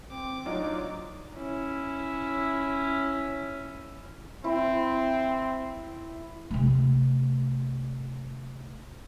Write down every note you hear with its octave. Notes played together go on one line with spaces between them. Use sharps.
C4 D6
F#3 D4 D#4 F4
C#4 E4
C4 E4
C3 A3